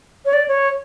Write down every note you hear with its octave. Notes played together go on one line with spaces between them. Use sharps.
C#5
D5
C#5